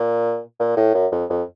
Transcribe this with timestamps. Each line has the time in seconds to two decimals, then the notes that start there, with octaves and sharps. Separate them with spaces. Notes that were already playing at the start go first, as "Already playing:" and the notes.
Already playing: A#2
0.60 A#2
0.77 A2
0.94 F#2
1.12 F2
1.30 F2